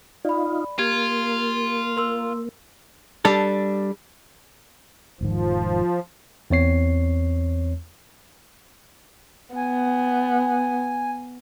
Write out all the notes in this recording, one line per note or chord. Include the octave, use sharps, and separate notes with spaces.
D#4 F4 D5 B5
A#3 F4 G4 G#6
A#4 C6 E6
G3 D4 A4
E1 G#2 D#3 F3
E2 C4 C#5 C7
B3 G#5